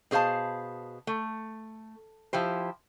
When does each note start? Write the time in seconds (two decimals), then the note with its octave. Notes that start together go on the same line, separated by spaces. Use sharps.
0.11 B2 G#4 C5 F5 A5
1.07 A3
2.33 F3 E4 G4 C5